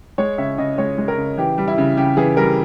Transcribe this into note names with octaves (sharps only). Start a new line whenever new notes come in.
G#3 C#5
C#3 E5
C#3 D#5
G#3 C#5
G#3
A#4
C#3
E3 G4
G3
E4
C#3
C#3 G4
E3 G#4
G3 A#4